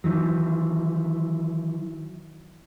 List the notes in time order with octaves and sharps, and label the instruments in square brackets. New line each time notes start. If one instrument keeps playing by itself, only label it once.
[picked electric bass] D#3 E3 F#3